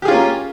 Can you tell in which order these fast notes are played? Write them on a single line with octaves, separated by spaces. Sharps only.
G4 G#4 F4 C#4 A#3